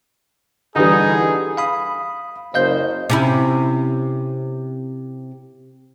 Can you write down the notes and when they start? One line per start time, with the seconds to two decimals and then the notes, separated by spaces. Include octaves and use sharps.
0.76 D3 E3 G3 D#4 G#4
1.57 F5 B5 D#6
2.54 F#1 C5 D#5 F5 G6
3.10 C3 C#4 E4